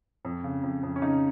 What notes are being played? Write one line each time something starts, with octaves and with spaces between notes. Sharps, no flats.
F2
C#3
F2
F2
C#4
C#3 D#4